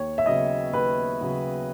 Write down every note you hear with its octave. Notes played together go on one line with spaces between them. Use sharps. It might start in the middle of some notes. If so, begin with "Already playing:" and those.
Already playing: D#2 C#5
E5
C#3 F#3 B3 D#5
D#2 B4
C#3 F#3 B3